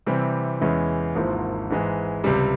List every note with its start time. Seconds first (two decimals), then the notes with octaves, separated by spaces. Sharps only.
0.07 C3 E3 G3 C4
0.61 E2 E3 G#3 C#4 E4
1.15 G#1 G#2 F3 A#3 E4
1.70 G#2 E3 G#3
2.24 C#2 C3 G3